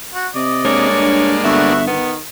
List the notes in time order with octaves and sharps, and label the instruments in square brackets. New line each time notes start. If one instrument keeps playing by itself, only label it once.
[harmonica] F#4
[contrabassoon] C3 [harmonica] D5 D#5
[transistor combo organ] G#3 A#3 D4 [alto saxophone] C#5
[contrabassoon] G2
[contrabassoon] G1 [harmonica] A3 B3 F#4 [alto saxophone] E5
[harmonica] D#3 [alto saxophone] B3